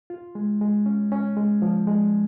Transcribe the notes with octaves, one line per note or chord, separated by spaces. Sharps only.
F4
G#3
G#3
C#4
C#4
G#3
F3
G#3